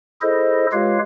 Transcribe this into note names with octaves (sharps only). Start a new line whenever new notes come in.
E4 G#4 A4 C5 D#5
G#3 F4 G4 B4 C#5 F5